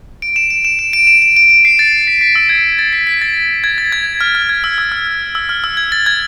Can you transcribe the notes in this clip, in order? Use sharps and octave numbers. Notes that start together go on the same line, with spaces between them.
D7
E7
D7
E7
D7
D7
E7
D7
D7
D7
C7
A6
B6
B6
E6
G#6
A6
B6
B6
A6
G#6
A6
G#6
F6
F6
G#6
E6
E6
F6
E6
F6
E6
G#6
A6
G#6